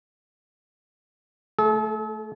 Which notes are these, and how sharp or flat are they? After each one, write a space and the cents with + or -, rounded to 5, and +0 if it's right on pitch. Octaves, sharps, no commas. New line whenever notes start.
A3 +0 A4 -45